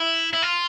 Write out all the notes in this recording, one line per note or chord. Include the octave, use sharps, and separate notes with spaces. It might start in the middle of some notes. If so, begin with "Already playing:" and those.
Already playing: E4
E4
F4